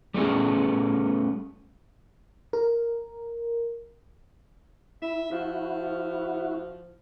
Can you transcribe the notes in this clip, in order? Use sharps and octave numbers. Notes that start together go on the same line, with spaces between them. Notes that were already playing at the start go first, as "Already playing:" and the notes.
G3 A3 B3 C#4 G#4
A#4
E4 E5
F3 E4 F#4